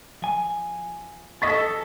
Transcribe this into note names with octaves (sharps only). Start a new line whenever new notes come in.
F3 G#5
A4 D#5 C#6 A6 B6